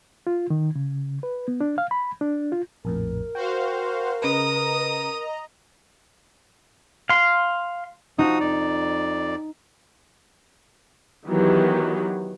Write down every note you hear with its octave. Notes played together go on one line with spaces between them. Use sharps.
F4
D#3
C#3
B4
B3
D4
F5
B5
D4
F4
A#1 F2 A2 A#4
F#4 C5 F5 G5
C#3 B4 D#5 A#5 D#6
F5 C6
F3 D#4 F#4 D#6
F2 D5
D#3 E3 F#3 B3 G4